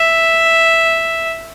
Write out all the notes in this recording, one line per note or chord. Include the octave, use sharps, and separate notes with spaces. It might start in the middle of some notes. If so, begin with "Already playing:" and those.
Already playing: E5